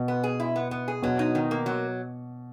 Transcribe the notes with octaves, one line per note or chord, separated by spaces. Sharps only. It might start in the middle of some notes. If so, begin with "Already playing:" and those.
Already playing: B2
B3
G#4
E4
B3
B3
G#4
B2 F#3
D#4
D#3
A#3
F#3